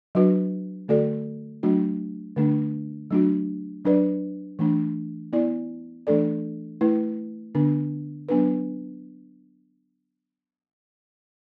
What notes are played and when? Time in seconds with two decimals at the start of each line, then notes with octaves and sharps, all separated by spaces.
0.15 F#3 D4 F#4 B4
0.88 D3 A3 F#4 A4 D5
1.63 F#3 A3 D4 F#4
2.36 D3 A3 D4
3.11 F#3 A3 D4 F#4
3.85 F#3 D4 B4 D5
4.59 E3 A3 D4
5.33 B3 E4 D5
6.07 E3 A3 D4 A4 D5
6.81 A3 E4 B4
7.55 D3 B3 D4
8.29 F#3 B3 D4 B4